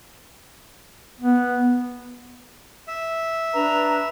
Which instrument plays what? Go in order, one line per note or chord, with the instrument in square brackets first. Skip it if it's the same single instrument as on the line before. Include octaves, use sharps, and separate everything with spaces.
[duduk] B3
[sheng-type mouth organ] E5
[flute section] D4 B4 A#5